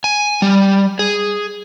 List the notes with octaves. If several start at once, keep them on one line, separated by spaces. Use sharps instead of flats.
G#5
G3
G#4